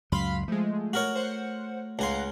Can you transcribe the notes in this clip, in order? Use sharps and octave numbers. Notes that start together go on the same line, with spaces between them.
C#2 F#2 F#3 F5 B5 C6
F3 G#3 A3
F#4 A#4 C#5
C5 F#5
C#2 F5 F#5 G#5 A#5 C6